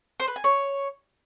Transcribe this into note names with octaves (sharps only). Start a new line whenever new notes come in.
C5
B4
G#5
C#5